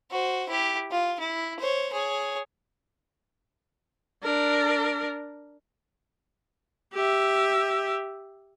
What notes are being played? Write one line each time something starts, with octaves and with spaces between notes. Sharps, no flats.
F#4 C5
E4 G4
F4
E4
C5 C#5
G#4 C#5
D4 A#4
G4 E5